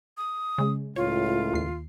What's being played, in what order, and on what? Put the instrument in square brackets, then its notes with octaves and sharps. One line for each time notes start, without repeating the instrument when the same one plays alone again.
[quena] D#6
[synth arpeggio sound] C#3 G#3
[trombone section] C#2 A2 [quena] F4 [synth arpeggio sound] C#5
[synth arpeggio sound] D#2 C7